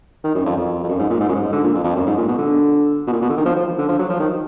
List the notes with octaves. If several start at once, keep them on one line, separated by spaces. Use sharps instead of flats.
D#3
F#2
F2
F2
F2
F#2
G#2
A#2
G#2
F#2
G#2
D3
A#2
F2
F2
F#2
G#2
A#2
B2
D3
B2
A#2
B2
D3
D#3
F3
F3
D3
F3
F#3
F3
D#3